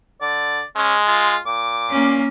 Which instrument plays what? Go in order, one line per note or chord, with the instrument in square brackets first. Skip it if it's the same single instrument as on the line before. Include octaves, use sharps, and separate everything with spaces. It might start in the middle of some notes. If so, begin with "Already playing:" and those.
[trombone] D3 [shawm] D5
[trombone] G#3 [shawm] C#4
[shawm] F4
[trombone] A#2 [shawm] D6
[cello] A#3 C#4